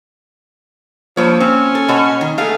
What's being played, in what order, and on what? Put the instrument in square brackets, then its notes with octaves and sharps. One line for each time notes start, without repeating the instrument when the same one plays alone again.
[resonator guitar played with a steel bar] G2 C#5 [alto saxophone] F3 [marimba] A#3
[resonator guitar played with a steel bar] C4 [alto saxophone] C#4
[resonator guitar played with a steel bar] A4
[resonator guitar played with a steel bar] B2 F#4 C#5 [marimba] D#5
[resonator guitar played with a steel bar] D#3
[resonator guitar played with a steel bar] A3 B3 G#4 [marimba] A4 E5 [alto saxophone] F5